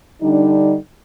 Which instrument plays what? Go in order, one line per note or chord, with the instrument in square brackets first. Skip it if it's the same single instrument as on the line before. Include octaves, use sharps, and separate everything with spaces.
[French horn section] D3 G3 D4 D#4